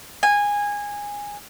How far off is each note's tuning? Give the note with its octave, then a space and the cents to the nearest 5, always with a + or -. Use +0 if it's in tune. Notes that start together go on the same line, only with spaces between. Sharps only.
G#5 -15